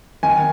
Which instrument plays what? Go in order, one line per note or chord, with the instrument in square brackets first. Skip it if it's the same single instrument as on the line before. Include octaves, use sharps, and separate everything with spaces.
[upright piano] D#3 G#5